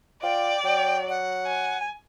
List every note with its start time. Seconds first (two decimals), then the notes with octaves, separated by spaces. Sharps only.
0.23 F4 D5 G5
0.64 F#3 G5
1.09 F#5
1.46 G#5